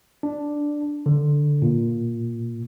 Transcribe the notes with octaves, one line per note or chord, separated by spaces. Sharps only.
D4
D3
A#2